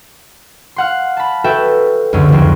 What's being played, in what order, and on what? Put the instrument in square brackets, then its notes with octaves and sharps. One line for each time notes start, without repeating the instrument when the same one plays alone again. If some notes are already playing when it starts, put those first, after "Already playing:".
[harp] F5 F#5 C6
A5 B5
F#4 A4 B4 E5 G5
C#2 F#2 D3 C#4
F1 F2